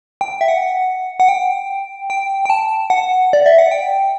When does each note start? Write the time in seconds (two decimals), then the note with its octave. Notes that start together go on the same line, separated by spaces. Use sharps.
0.21 G5
0.41 E5
0.48 F#5
1.20 F#5
1.29 G5
2.10 G5
2.46 G5
2.50 A5
2.90 F#5
3.33 D5
3.46 E5
3.58 F#5
3.71 G5